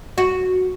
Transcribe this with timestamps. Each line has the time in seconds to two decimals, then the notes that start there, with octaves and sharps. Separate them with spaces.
0.18 F#4